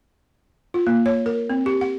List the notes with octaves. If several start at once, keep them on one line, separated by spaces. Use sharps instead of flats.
F4
A#3
C#5
A#4
C4
G4
F#5